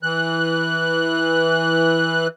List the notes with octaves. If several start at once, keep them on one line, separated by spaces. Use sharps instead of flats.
E3 F#6